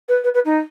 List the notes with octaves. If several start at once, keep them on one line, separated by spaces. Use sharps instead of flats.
B4
B4
B4
D#4